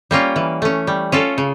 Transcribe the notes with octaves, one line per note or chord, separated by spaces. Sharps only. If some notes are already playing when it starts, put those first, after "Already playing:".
G3 A#3 C#4 F4
E3
A3 C#4
G3
C#4 F4 A4
C#3